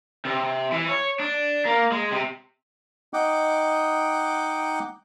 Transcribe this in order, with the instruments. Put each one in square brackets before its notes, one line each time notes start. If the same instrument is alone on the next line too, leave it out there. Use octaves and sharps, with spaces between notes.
[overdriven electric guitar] C3
E3
C#5
D4
A#3
G#3
C3
[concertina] D#4 D#5 F#5 G5 D6